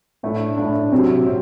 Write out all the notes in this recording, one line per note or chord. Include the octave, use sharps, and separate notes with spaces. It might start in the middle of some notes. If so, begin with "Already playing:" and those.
A2 A3 D4
A2 A3 D4
C3 F#3 C4 G4 C5
C3 F#3 C4